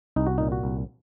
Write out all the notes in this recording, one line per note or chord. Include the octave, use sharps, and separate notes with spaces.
C2 D#4
F#4
A#2 D#4
F#4
C2